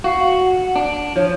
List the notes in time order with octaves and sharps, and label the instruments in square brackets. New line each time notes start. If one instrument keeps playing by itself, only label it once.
[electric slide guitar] F#4 [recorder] F5
[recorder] F#5
[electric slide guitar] D4
[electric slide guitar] F3 [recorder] C#5